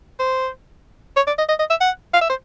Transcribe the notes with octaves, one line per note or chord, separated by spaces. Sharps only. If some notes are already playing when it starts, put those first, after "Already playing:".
C5
C#5
D5
D#5
D#5
D#5
E5
F#5
F5
E5
C5